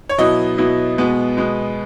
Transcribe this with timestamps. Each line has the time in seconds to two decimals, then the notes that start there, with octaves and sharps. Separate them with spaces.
0.09 C#5
0.18 B2 F#3 B3 E4 D#5
0.58 B2 F#3 B3 E4
0.98 B2 G#3 B3 B4
1.37 B2 G#3 B3